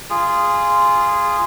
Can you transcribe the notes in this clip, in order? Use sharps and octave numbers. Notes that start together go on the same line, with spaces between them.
F4 G#4